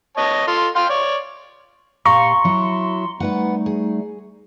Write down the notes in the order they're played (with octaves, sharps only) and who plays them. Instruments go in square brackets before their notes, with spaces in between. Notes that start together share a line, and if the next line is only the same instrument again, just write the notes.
[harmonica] C#5 D#5 A5
F4 A4
F5 G5 C6
C#5 D5
[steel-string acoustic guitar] A#2 G4 F5 [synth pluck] A#5 C#6 [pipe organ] C6
[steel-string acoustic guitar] F#3 E4
[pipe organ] G3 A3 D#4 [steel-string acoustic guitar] B3 B4 F#5
[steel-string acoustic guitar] G#4